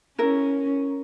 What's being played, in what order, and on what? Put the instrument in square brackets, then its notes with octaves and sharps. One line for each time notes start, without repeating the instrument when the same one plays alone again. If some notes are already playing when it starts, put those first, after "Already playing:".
[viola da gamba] C#4 [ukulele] E4 A#4